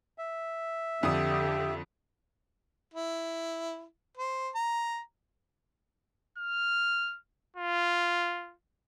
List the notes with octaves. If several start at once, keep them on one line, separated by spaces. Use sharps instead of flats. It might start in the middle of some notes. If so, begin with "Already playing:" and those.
E5
F2 D3 F3 G4 D#6
E4
C5
A#5
F6
F4